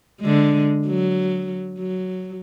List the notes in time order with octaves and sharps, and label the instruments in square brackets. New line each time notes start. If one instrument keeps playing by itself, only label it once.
[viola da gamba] D3 G#3
F#3
F#3